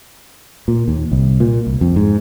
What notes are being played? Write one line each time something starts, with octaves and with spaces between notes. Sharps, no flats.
A#2
D#2
C2
A#2
C2
F2
G#2